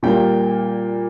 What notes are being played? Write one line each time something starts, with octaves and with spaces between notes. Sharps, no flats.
A#2 G3 A#3 G5